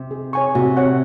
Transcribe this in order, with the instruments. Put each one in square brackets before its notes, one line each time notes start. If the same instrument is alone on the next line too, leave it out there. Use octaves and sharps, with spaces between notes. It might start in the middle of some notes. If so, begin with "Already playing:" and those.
Already playing: [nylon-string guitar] C3
[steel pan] G#4
C#5 G#5 C#6
[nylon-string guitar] C3 [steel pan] F#4
[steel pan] C#5 F#5